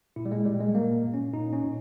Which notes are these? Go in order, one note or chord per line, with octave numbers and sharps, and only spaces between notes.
A#2 E4
G3
G#3
A#2 G3
G#3
A#2 A#3
A#2
C#4
A#2 D#4
C#4
A#2